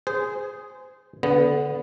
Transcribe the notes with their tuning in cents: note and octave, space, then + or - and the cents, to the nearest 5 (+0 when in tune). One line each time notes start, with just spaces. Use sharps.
G#4 +0 C5 -25
D3 -30 B3 +0